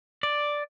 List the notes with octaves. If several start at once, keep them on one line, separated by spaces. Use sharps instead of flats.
D5